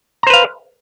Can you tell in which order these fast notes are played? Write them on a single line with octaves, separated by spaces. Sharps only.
A#5 C5 B4 F5